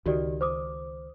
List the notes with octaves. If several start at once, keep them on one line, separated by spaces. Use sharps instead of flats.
C#2 D#3 F#4 G4 D5
C5 D6 D#6